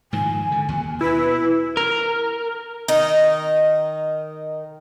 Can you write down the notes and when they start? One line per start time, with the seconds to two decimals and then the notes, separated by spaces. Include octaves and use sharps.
0.13 G#2 D#3 F3 G#5
0.52 D3
0.69 D#2 F#3
1.01 B2 E4 B4
1.77 A#4
2.88 D#3 D#4